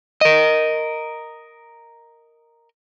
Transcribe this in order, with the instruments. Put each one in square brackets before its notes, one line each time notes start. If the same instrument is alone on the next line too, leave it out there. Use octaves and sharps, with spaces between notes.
[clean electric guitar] A#4 D#5